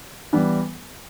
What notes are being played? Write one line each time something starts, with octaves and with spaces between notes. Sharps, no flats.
E3 G3 B3